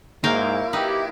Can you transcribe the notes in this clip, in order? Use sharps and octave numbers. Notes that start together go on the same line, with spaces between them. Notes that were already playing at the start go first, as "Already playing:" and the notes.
G#2 F#3 A#3 E4 A#4 F5 G5
D#4 G4 B4